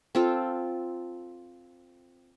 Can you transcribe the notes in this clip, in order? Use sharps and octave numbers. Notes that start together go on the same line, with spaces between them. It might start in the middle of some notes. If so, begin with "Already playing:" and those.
C4 F4 A4